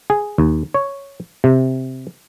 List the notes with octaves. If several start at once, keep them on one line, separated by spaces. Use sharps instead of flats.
G#4
D#2
C#5
C3